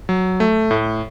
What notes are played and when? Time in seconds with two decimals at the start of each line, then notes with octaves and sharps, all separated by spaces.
0.09 F#3
0.40 A3
0.71 A2